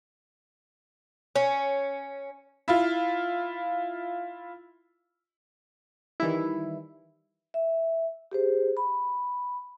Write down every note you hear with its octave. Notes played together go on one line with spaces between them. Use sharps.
C#4
E4 F4
D#3 E3 G3 E4
E5
G4 G#4 C5
B5